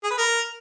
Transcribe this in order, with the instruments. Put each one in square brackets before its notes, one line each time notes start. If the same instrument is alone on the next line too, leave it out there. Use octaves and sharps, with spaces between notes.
[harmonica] G#4
B4
A#4